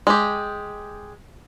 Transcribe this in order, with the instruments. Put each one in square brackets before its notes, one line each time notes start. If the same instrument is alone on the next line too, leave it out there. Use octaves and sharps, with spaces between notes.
[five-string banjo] G#3 G4